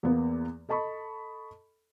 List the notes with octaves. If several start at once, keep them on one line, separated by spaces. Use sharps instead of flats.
E2 A#3 B3
A4 D#5 A5 B5 C#6